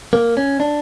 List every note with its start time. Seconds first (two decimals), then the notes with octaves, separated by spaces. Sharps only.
0.13 A#3
0.37 C#4
0.60 D4